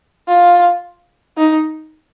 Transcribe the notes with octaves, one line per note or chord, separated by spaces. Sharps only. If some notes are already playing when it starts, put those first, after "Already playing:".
F4
D#4